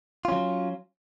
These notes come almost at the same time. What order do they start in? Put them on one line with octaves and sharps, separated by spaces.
F4 C#4 F#3